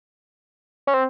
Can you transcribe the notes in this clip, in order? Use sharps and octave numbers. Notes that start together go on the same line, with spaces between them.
C#4
C4